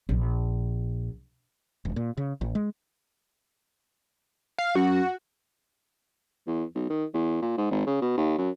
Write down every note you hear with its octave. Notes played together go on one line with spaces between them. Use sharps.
A#1
E1
A#2
C#3
A1
G#3
F5
F#2 F#4
E2
B1
D#3
E2
A#2
G#2
G#1
C#3
B2
D#2
F#2